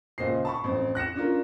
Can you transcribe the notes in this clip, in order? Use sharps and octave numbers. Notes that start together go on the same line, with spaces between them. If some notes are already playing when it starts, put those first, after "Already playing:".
C#2 A#2 C5 D#5 C7
A5 B5 C#6
A1 F2 C5
F#6 A#6 C#7 E7
C#4 D4 F4 A#4